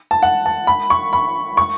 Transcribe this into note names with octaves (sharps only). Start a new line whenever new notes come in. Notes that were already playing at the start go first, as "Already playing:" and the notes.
A5
F#5
A5
B5
C#6
B5
C#6